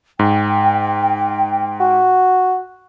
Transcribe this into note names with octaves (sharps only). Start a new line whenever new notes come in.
G#2 G5
F#4